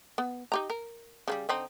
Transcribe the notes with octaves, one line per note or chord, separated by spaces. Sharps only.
B3
D#4 G4 A#5
A#4
C#3 F#3 G3
D3 C4 D#4